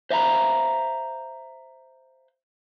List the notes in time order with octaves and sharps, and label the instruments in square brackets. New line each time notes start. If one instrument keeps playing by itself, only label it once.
[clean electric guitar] C5 E5 F5 G#5 A#5 B5